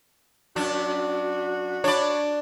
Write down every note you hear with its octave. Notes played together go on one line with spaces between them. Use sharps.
F#2 D4 F#4
D4 C#5 D5 B5